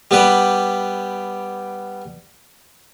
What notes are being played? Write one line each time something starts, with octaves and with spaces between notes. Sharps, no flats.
G3 B3 G4 B4